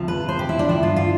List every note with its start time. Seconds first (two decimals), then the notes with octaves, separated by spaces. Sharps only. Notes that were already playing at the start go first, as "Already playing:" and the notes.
Already playing: D2 C3 F3
0.08 B4
0.29 C5
0.39 G4
0.49 E4
0.59 D4
0.69 G2 D3 F3 E4
0.83 F4
0.96 F4